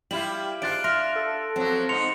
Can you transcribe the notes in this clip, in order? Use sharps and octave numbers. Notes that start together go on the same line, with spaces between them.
G3 E4 F4 G4 F#7
G#2 D4 F4 F#6 A6 D7
E5 C6 F6 A#6
A4
F3 F#3 C4
G#2 F3 D#4 C6 C#7 F7